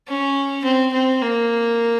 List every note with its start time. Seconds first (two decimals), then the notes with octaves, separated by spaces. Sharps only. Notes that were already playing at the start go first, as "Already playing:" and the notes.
0.08 C#4
0.65 C4
0.93 C4
1.22 A#3